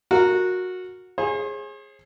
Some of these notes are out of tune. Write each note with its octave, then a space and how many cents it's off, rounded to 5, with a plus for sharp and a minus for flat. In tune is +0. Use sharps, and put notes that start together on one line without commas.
F#4 -15 A#4 -10
G#4 +0 C5 +45